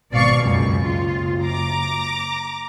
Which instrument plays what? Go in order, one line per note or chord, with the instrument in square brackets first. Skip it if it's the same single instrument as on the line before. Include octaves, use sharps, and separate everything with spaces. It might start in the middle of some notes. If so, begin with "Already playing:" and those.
[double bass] G#1 B2 [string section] D5 F5 C#6
[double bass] F#1 [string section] C#2 F#2
[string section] F4
A#5 D6